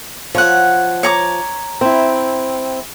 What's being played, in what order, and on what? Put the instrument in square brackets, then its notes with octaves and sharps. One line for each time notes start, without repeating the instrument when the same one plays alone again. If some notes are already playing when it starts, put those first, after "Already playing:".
[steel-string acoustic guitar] F3 [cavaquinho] C#5 F#5
[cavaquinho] C#5 A#5 D6
[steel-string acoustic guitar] C4 E4